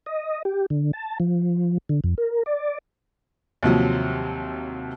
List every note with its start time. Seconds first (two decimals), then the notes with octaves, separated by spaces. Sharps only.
0.06 D#5
0.45 G4
0.70 D3
0.93 A5
1.20 F3
1.89 D3
2.04 F2
2.18 A#4
2.46 D5
3.63 D#2 C3 F3 F#3